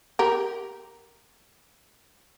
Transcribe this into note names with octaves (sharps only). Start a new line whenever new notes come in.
G4 A#4